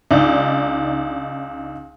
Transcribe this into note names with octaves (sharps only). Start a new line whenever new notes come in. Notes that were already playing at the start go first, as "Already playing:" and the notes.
C#2 D4 D#4